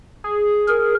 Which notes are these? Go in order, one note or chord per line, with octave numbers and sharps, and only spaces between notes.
G#4
G#4 A#4